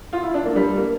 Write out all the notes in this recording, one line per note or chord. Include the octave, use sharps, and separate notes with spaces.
F4
E4
D4
A#3
G3
A#3